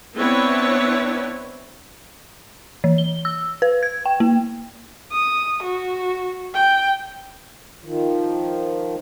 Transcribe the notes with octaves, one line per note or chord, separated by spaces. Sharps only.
B3 C4 D4 E4 B4 C#5
E3
G7
E6
B4
G#6
G5
A#3
D#6
F#4
G5
D#3 F3